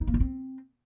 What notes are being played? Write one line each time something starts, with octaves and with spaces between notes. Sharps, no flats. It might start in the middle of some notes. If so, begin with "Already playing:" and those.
D#4
A#3
D#4
C4